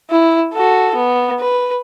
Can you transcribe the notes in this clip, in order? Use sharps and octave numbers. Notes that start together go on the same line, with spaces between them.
E4
F#4 A4
B3
B4